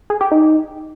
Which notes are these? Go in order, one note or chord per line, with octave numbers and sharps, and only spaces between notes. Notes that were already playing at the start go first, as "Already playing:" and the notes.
G#4
G4
D#4